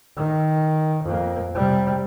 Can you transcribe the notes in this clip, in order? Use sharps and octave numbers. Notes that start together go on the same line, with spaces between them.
D#3
F2 A#3
C3 G3